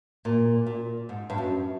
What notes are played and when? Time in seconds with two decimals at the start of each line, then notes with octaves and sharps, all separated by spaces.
0.25 A#2
0.67 A#2
1.09 G#2
1.30 G2
1.38 F#2